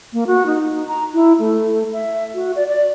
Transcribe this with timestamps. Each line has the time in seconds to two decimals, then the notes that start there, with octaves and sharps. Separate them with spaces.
0.13 A#3
0.27 F#4
0.46 D#4
0.88 A#5
1.14 E4
1.40 A3
1.92 E5
2.34 F#4
2.56 D5
2.68 D5